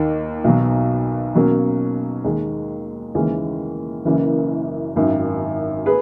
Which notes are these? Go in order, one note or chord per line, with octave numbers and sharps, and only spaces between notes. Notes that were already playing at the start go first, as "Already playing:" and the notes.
Already playing: D#2 D#3 A#3 D#4
B1 B2 F#3
B2 F#3 A#3 C#4
D#2 D#3 G#3
D#2 C#3 E3 G#3 C#4
F#1 F#2 E3 A#3 C#4
G#1 F#2 D#3
G#4 B4